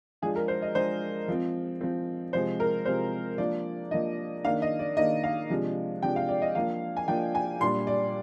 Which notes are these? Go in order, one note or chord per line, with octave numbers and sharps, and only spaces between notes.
F3 G#3 D4 G#4
A#4
C5
D#5
F3 G#3 D4 C5
F3 C4
F3 C4
C3 F3 G#3 C5
A#4
C3 F3 G#3 C5
F3 A#3 D4 D5
F3 A#3 D4 D#5
D#3 A#3 D4 F5
D#5
D5
D#3 A#3 D4 D#5
F5
C3 F3 G#3 D4
C3 F3 G#3 D4 G5
F5
D5
D#5
F3 A#3 D4 F5
G#5
F3 A#3 D4 G5
G#5
A#2 G3 D4 C6
D5